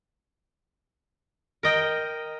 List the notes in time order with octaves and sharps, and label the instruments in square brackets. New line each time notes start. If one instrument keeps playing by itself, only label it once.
[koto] A#4 D#5 G5